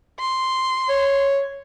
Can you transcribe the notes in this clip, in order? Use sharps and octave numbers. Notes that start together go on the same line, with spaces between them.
C6
C#5